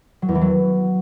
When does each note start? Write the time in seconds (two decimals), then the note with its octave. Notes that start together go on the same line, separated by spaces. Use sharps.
0.22 F#3
0.29 E2
0.35 E3
0.41 F#3